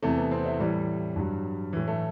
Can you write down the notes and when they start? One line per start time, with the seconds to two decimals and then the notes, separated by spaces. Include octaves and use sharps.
0.03 E2 C3 E3 A3
0.17 B3
0.31 C4
0.46 E4
0.59 A2 E3 G3
1.16 G2 F#3
1.73 A2 E3
1.87 A3